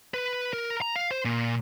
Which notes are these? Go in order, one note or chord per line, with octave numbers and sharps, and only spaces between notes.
B4
A#4
A#5
F5
C5
A#2